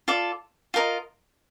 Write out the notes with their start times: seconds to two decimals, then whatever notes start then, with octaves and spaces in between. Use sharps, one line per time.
0.08 F4 A4 D5
0.74 F4 A#4 D#5